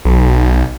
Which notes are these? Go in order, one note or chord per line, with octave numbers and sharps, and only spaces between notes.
B1